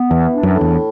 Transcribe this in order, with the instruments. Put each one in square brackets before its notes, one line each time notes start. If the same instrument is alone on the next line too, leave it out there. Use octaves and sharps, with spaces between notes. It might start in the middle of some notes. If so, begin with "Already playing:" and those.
Already playing: [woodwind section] B3
[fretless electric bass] E2 [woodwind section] E3
[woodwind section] D4
[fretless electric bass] F#2
[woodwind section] A2
[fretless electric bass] E2